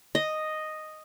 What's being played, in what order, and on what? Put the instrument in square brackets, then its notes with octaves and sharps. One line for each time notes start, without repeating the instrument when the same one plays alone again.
[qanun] D#5